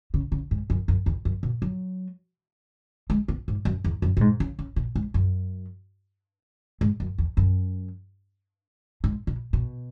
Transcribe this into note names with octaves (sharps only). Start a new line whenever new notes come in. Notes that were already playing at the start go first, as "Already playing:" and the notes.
C#3
C#3
G#2
F#2
F#2
E2
F#2
B2
F#3
G#3
B3
G#2
F#2
E2
F#2
B2
G#2
C#3
C#3
B2
G#2
F#2
G#2
F#2
E2
F#2
G#2
B2
B2